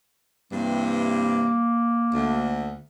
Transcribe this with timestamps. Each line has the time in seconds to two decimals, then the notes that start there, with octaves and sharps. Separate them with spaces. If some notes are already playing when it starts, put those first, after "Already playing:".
0.52 G2 C3 E3 A#3
2.13 D2